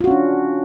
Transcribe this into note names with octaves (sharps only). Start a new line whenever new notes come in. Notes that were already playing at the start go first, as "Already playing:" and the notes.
C#4 D4 F4 F#4